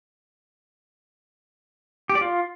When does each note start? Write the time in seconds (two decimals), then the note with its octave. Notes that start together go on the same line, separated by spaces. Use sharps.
2.10 G4
2.15 D5
2.21 F4